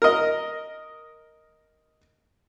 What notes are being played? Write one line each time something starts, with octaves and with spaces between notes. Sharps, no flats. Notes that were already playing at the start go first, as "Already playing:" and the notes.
A#4 D#5